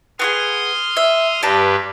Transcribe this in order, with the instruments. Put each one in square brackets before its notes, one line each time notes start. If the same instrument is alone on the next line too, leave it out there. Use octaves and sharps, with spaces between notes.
[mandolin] B3 F#4 G#4 [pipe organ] C6 D#6 F6
[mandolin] E5
[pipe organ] G2 G4 B4 [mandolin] D5 A5 A#5